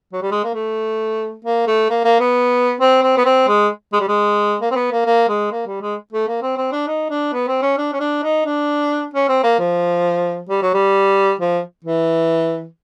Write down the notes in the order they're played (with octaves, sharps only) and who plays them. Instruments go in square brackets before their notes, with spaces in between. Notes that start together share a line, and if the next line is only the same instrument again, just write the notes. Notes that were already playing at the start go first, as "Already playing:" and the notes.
[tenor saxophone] F#3
G3
G#3
A#3
A3
A#3
A3
A#3
A#3
B3
C4
C4
B3
C4
G#3
G#3
G3
G#3
A#3
C4
B3
A#3
A#3
G#3
A#3
G3
G#3
A3
A#3
C4
C4
D4
D#4
D4
B3
C4
C#4
D4
C#4
D4
D#4
D4
C#4
C4
A#3
F3
G3
F#3
G3
F3
E3